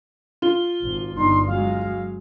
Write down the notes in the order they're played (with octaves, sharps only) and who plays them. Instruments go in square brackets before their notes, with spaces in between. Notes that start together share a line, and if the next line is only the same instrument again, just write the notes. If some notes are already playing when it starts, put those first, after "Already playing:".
[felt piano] F4 [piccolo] G7
[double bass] G#1
[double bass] G1 D#4 [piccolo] C6
[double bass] F#3 G#3 [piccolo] F5